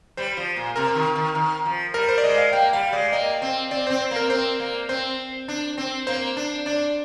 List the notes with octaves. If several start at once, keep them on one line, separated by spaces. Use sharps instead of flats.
G3 C5
F3
A#2
C3 A#4
D#3
D#3
D#3
F3
G3 A#4
C5
D5
G#3 D#5
F5
A#3 G5
G3 F5
G#3 D5
A#3 D#5
C4
C4 D5
C4 C5
C5
A#3
A#4
C4 C5
A#3
C4 C5
D4
C4
A#3 C5
D4
D4 D5